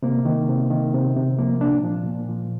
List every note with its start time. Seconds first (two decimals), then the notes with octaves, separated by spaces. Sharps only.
0.02 C3 A#3
0.25 D#3
0.49 C3
0.70 D#3
0.94 C3
1.16 C3
1.39 F3 A#3
1.61 A#2 D4
1.83 F3
2.07 A#2
2.29 F3